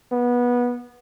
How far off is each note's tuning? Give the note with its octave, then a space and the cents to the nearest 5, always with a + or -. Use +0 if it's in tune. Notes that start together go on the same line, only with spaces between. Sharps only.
B3 -20